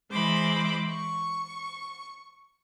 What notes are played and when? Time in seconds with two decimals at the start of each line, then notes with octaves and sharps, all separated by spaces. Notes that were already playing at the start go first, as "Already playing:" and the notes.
0.10 E3 G#3 C5 B5 D6
0.90 C#6